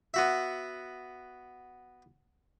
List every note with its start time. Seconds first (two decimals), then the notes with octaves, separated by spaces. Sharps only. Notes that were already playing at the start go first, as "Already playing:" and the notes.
0.14 B3 F#4 E5